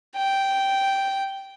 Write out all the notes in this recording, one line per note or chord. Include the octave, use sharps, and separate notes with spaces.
G5